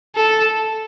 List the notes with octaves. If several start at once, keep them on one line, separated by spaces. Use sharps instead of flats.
A4